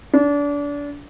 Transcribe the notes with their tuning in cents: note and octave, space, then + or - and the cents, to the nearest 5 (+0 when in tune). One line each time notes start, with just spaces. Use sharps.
D4 -30